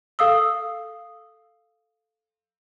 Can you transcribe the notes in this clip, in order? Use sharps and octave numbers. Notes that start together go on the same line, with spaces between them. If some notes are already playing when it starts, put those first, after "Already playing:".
A4 F5 D#6 E6